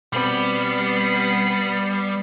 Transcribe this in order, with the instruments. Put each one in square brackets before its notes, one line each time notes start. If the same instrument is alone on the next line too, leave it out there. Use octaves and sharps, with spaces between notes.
[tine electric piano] B2 C4 [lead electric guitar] G3 [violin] B3 C7